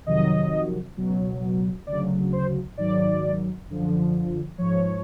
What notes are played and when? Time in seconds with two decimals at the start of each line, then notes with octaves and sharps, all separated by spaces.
0.06 F2 C3 D#3 F#3 D#5
0.97 C#2 B2 F#3
1.87 D2 C#3 F#3 D5
2.33 C5
2.77 G#2 D#3 F#3 D5
3.68 F#2 D3 F3
4.58 G#2 F3 C#5